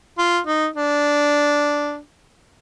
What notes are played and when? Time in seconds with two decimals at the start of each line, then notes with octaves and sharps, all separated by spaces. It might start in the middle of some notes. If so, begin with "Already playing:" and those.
0.18 F4
0.47 D#4
0.76 D4